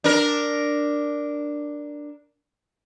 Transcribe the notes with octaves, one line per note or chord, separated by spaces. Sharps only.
D4 A#4